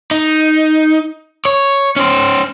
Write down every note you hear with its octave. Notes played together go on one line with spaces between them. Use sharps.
D#4
C#5
C#4 C5